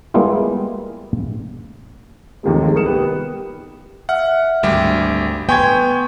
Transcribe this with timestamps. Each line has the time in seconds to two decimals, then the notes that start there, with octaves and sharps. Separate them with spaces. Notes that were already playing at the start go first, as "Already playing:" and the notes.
0.14 G3 G#3 A#3 B3 E4 F4
2.43 D#2 C3 D#3 F3 G#3 A3
2.74 C2 A#4 D#6 C#7 E7
2.86 B3 G4 B4
4.09 E5 F#5 F6
4.63 G#1 D2 G3 G4
5.49 B3 G5 G#5 C6 C#6 G#6